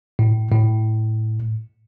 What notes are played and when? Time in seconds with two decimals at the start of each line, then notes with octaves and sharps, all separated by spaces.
0.19 A2
0.51 A2